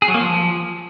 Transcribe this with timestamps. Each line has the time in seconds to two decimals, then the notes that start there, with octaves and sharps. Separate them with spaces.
0.02 G#4
0.08 F#3
0.14 A#3
0.20 F3